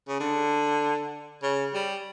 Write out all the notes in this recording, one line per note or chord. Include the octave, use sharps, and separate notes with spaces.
C#3
D3
C#3
G3